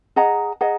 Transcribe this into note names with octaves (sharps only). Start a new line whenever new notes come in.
G#4 D#5 F#5 A#5
G#4 D#5 F#5 A#5